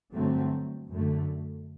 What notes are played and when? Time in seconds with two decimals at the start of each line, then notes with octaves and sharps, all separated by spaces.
0.13 G2 D3 F#3 A3 C4
0.89 F#2 D3 A3